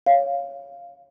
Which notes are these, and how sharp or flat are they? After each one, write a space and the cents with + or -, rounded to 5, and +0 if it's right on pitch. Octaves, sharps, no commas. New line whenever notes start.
C#5 +0 F5 +0